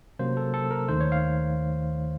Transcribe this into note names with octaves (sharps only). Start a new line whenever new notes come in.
C3 F#3 A#3 C#4 C5
A4
A4
A#4
D#2 D#3 A3 D#4 C5
C#5
F5